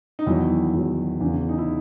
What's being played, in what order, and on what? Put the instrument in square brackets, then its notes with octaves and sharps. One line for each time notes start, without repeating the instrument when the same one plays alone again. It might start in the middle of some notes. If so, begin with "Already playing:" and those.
[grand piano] D#4
E2 D#3 F#3 E4
E2 D#3 F#3
E2 C#3 E3
D#4
E4